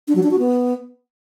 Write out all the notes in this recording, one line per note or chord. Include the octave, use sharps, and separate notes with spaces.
D4
F#3
D4
F#4
B3